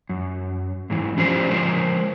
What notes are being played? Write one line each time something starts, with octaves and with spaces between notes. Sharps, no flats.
F#2
G#2 E3
F3 C#4 D4 F4 G4 C5
F3 G#3 A#4 C5